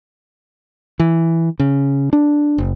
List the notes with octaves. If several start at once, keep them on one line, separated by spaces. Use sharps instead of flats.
E3
C#3
D4
F#1